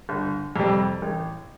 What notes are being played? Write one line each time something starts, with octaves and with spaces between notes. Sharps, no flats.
G1
F2 C3 G3
A1